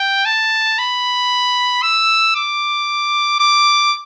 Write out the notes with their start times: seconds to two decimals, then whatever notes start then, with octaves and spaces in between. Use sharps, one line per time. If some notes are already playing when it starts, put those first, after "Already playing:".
Already playing: G5
0.26 A5
0.78 B5
1.82 E6
2.36 D6
3.40 D6